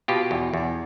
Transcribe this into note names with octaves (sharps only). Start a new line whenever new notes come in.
B2 F4 G4
E2
E2